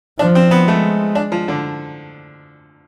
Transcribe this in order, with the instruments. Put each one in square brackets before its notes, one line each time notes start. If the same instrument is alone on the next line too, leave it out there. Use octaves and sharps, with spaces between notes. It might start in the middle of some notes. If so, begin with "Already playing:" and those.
[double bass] F3 [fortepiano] D4
[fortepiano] C4
B3
[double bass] G#3 [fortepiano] A3
[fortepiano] D4
F3
D3